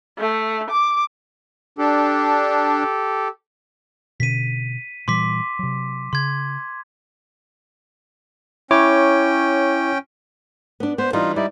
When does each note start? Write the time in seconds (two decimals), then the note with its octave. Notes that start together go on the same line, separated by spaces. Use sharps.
0.19 A3
0.71 D6
1.78 D4 G4 A4
4.20 B2 D3 C#4 B6 D#7
5.08 A#2 E3 G3 C6 D6 B6
5.59 C3 F#3
6.13 C#3 C6 G#6
8.71 C#4 E4 C#5 G5 D6
10.80 B3 D4
10.98 B3 C5
11.13 E3 G3 D4 D#4 F4
11.36 G3 D#4 E4 D5